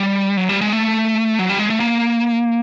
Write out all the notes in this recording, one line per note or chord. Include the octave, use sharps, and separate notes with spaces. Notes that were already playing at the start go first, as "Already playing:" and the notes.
Already playing: G3
F#3
G3
G#3
A3
F#3
G3
G#3
A3
A#3